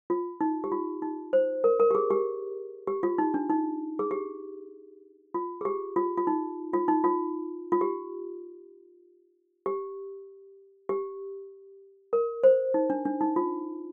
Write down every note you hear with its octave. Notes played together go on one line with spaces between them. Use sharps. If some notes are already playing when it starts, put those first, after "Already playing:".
F4
D#4
G4
F4
D#4
C5
A#4
A#4
G4
G#4
G4
G4
F4
D#4
D4
D#4
G#4
G4
F4
G#4
G4
F4
F4
D#4
F4
D#4
F4
F4
G4
G4
G4
A#4
C5
D#4
D4
D4
D#4
F4